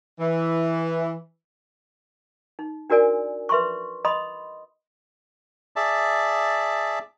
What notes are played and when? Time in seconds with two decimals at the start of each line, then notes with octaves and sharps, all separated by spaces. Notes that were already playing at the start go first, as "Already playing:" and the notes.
0.20 E3
2.59 D#4
2.90 D4 F#4 A#4 D5 G#5
3.49 B4 E5 C6 C#6
4.05 D#5 B5 C6 D#6
5.76 G#4 D5 E5 A5